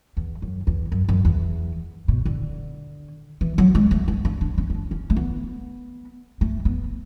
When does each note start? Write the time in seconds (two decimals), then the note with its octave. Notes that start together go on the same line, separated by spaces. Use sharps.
0.17 E2
0.42 F#2
0.67 E2
0.92 F#2
1.09 F#2
1.25 E2
2.08 B2
2.25 D3
3.41 E3
3.58 F#3
3.75 G#3
3.91 A3
4.08 B3
4.25 D4
4.41 D4
4.58 C#4
4.70 C#4
4.74 D4
4.91 C#4
5.10 A3
5.17 B3
6.41 A3
6.65 B3